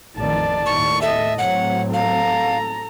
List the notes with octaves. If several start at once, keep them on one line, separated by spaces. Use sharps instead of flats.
A1 F2 D#3 D5 A5
D#2 A2 C#6
A4 D#5 E5
A2 F#3 C4 C#5 F#5
A4 F5 A#5